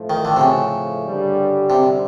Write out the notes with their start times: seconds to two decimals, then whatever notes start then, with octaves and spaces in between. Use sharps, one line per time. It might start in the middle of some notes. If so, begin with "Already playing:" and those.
Already playing: A2 F3 A3
0.10 D#3
0.25 D3
0.37 C3
0.41 C#3
1.05 G2 D3 G3
1.70 C3